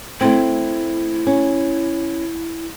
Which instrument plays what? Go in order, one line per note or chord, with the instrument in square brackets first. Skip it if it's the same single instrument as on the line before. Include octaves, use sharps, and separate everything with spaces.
[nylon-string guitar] A3 C4 [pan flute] E4
[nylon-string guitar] C#4